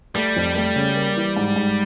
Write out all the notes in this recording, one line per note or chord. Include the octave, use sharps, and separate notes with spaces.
G3 A3
F2
A3
C#3
A#3
E3
G#2
G#2